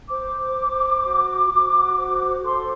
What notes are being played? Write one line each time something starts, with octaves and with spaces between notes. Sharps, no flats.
C5 D6
C5
F#4
F#4
C5
A4 C6